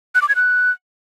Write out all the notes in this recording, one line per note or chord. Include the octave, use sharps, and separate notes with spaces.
F#6
D6
G#6
F#6